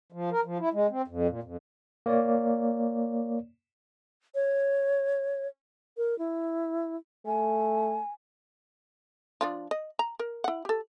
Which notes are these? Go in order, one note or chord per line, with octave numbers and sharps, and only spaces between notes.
F3
A#4
F3
E4
G#3
C4
F2
A#2
F2
A#3 C#5 D5
C#5
A#4
E4
A3 G#5
F3 D4 F4
D#5
A#5
A#4
E4 F#5
G4 A4